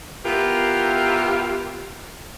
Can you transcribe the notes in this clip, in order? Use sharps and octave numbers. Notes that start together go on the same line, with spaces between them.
B3 E4 F4 G4 A#4